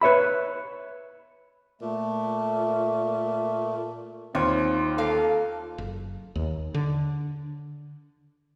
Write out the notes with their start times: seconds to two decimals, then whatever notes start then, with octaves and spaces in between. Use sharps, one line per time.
0.01 B4 C#5 E5 B5
1.82 A#2 A3
4.35 D#2 C4 F4 C#5
4.98 A#3 A4 F5
5.78 F#1
6.35 D#2
6.74 D3